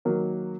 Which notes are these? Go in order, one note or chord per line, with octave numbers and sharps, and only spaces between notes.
D#3 F#3 A#3